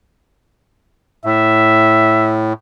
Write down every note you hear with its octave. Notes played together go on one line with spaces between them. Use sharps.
A2 E5